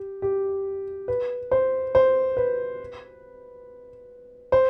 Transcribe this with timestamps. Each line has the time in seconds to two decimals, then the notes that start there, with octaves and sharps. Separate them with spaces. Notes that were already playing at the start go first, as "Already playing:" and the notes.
Already playing: G4
0.22 G4
1.08 B4
1.51 C5
1.95 C5
2.37 B4
4.52 C5